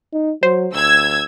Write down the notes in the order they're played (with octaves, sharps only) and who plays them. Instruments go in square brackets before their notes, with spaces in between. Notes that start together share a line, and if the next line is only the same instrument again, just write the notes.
[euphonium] D#4
[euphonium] F#3 [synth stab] C5
[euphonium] D2 [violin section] E6 G#6